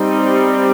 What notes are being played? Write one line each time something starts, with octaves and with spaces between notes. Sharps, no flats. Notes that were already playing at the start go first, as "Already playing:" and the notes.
Already playing: G3 C4 D#4